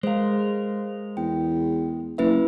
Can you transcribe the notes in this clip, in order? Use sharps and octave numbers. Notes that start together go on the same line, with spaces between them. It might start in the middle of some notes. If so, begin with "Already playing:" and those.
G#3 A#4 C5 F5
E2 G5
F#1 E4 B4 E5